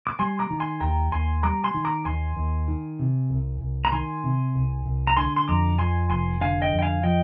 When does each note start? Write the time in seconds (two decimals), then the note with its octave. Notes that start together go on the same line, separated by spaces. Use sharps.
0.07 D6
0.19 G3 G#5 C6
0.39 A#5 D6
0.50 D#3
0.60 G#5 C6
0.81 D#2 G5 A#5
1.12 D#2 G#5 C6
1.43 G3 A#5 D6
1.64 G#5 C6
1.74 D#3
1.85 A#5 D6
2.05 D#2 G#5 C6
2.36 D#2
2.68 D#3
2.99 C3
3.30 C2
3.61 C2
3.85 A#5
3.92 D#3 G#5 C6
4.24 C3
4.55 C2
4.85 C2
5.07 A#5
5.17 D3 G#5 C6
5.36 C6
5.48 F2 A#5 D6
5.79 F3 G#5 C6
6.10 F1 G#5 C6
6.41 D3 F5 G#5
6.62 D#5 G5
6.72 F2
6.79 G5
6.82 F5 G#5
7.03 F3 D#5 G5